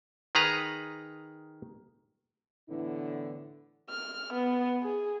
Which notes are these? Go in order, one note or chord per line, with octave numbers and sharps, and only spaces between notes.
D#3 G#4 B4 A#5
A2 D3 E3 B3 E4
F6
B3
G#4